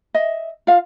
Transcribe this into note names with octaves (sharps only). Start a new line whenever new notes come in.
D#5 E5
F4 F5